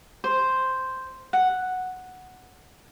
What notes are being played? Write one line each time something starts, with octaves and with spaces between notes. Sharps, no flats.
C5
F#5